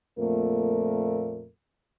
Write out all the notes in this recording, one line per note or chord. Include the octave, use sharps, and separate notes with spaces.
F2 A#2 A3 A#3 A#4